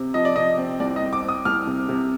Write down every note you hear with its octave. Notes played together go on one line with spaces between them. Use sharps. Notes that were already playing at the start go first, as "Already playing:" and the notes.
Already playing: C3
F3 D#5
D5
C3 D#5
C4
C2 D5
D#5
C4
D6
C4 D#6
C2 F6
C3
C3